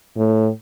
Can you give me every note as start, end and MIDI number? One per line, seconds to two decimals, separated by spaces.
0.17 0.49 45